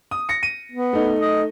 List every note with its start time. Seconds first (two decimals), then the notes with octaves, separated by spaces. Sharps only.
0.11 D#6
0.29 A#6 C#7
0.43 D#7
0.72 B3
0.93 A3 D#4
1.20 D#5